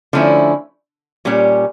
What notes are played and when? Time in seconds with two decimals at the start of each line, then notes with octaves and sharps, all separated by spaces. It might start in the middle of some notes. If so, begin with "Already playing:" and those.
0.13 D3 F3 A3 C#4 E4
1.25 A#2 G3 C#4 G4